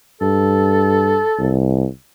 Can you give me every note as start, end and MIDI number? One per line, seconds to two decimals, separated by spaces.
0.21 1.21 43
0.21 1.57 69
1.38 1.86 36